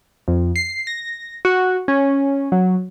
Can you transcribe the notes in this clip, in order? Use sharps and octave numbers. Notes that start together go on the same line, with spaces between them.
F2
C7
A#6
F#4
C#4
F#3